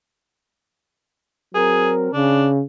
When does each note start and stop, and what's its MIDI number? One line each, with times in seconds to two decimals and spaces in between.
1.55 2.12 54
1.55 2.12 60
1.55 1.92 68
1.55 2.12 70
2.13 2.61 49
2.13 2.48 62